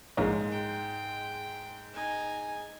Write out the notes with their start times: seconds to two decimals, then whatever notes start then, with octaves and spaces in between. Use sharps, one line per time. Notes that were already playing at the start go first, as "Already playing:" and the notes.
0.17 A#1 G#2 G#3 A#3 C#5
0.51 G5
1.93 D#4 G#5